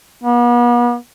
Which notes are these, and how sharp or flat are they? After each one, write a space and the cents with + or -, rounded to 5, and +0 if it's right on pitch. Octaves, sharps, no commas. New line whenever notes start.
B3 -40